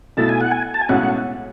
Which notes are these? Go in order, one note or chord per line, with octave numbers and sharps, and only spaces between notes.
B1 B2 A3 E4 A5
G#5
F#5
G#5
A5
G#5
B1 A2 G#3 C#4 F#4 F#5